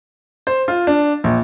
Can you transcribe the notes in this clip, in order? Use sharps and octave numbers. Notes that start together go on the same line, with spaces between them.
C5
F4
D4
A#1